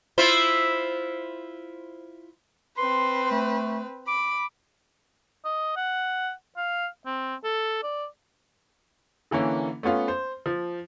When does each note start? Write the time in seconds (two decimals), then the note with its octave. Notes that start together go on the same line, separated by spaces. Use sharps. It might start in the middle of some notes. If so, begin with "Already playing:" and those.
0.18 E4 F4 C5
2.77 C4 B4 C6
3.31 A3
4.08 B5 D6
5.45 D#5
5.76 F#5
6.57 F5
7.06 C4
7.44 A4
7.83 D5
9.31 D3 E3 A#3 C#4
9.83 A3 B3 C#4 F4
10.08 C5
10.46 F3